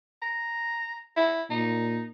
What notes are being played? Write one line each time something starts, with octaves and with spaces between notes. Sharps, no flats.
A#5
E4
A#2 D#4